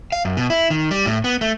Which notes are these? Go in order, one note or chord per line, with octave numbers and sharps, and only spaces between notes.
F5
F#2
B2
E4
D#3
G3
A2
B3
A3